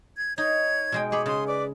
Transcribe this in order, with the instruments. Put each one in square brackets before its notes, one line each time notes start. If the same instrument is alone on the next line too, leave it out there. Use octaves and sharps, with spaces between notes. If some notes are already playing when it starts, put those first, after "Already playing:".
[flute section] G#6
[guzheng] D#4 [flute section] C#5 G#6
[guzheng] B2 G#3 G5
[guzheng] G#4 C#5 B5 [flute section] D6
[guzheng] C#3 [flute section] C6 D#6
[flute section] B4 D5 D6